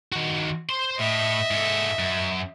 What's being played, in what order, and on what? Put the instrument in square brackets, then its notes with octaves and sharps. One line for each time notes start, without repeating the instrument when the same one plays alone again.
[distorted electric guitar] D#3 F#4
C5 C6
[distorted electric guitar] A2 [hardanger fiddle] D#5 E5
[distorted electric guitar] G#2 A4
F#2